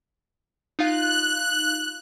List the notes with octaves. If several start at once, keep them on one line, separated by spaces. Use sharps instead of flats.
D#4 F4 F5 F#6